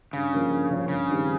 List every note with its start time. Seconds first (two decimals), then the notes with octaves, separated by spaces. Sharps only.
0.13 G2 C#3
0.32 F3 A#3 C#4
0.51 G2
0.70 F3 A#3 C#4
0.89 G2 C#3
1.08 D#3 G3 C4